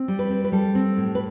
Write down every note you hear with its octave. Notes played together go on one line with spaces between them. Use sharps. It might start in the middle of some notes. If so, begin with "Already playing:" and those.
Already playing: C4
G3
B4
C4
B4
G3 A4
C4
A2
B4